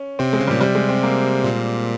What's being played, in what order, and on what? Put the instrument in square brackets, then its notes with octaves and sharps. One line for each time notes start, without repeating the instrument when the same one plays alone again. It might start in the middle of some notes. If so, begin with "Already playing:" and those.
Already playing: [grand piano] C#4
[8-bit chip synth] C3 [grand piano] C4
[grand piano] G#3
[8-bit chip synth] C#3
[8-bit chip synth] A#2 [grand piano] G3
[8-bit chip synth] C3 [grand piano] G3
[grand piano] G#3
C4
A#3
[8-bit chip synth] A#2